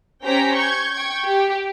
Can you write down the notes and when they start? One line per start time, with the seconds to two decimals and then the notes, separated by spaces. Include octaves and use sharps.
0.24 C#4 G4 C5 G5 A#5 B6
0.54 C#6 G6 G#6
0.95 G5 C#6 G#6
1.24 G4